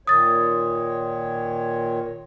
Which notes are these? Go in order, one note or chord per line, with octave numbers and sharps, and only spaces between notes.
A#2 D#3 C#5 D#6 A6